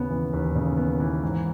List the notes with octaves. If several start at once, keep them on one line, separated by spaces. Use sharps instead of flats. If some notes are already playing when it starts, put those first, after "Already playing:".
Already playing: D#2 C#3 B3
E3
D#2
C#3
B3
E3
G#2